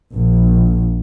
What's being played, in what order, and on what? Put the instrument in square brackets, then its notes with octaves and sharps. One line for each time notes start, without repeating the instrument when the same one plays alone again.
[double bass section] A#1